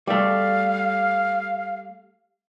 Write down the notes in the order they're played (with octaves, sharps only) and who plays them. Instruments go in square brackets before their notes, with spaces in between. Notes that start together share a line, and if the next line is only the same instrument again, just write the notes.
[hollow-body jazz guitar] G3 A3 [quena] F5